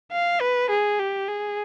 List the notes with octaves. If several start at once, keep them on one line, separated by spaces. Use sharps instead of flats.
F5
B4
G#4
G4
G#4